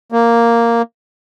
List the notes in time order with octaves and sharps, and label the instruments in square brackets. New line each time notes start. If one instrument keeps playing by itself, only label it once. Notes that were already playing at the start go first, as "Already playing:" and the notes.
[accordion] A#3